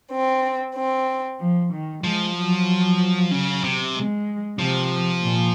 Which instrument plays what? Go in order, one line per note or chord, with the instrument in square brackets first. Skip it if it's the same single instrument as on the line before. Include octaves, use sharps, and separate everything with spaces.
[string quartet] C4
C4
F3
D#3
[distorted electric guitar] F3 [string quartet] G#3
[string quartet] F#3
[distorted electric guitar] C#3
C3
[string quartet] G#3
[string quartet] C3 [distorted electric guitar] F3
[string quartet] A#2